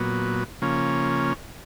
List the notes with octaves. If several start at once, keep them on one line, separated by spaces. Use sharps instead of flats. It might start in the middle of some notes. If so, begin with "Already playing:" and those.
Already playing: A#2 F#3 B3
C#3 F3 A#3 C#4